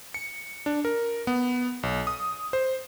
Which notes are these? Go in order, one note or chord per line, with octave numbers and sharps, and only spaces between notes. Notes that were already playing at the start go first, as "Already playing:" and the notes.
C#7
D4
A#4
B3
B1
D#6
C5